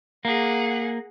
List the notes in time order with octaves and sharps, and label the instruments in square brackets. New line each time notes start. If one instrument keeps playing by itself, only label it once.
[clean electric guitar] A#3 [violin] G#4 F#5